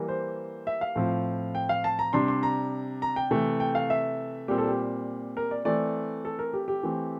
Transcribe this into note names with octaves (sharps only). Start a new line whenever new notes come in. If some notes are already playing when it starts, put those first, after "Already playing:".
Already playing: E3 G3 A#3
C5
E5
F5
A2 F3 C4
G5
F5
A5
A#5
C3 G3 D4 C6
C6
A#5
A#5
G5
C3 E3 A3
G5
F5
E5
A#2 G3 C4 G4
A4
G4
A#4
D5
E3 A3 C4 D5
A4
A#4
G4
G4
E3 A3 C4